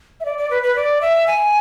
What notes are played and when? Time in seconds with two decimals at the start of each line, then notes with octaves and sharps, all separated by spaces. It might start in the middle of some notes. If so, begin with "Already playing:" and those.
0.20 E5
0.25 D5
0.38 D5
0.51 B4
0.63 B4
0.76 D5
1.01 E5
1.27 G#5